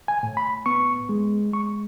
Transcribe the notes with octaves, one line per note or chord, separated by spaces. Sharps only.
G#5
A2
B5
B3 C#6
G#3
G#3 C#6